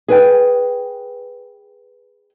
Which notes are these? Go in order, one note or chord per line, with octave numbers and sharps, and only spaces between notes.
G#4 B4 G5